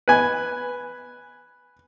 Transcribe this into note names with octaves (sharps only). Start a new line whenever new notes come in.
B4 G#5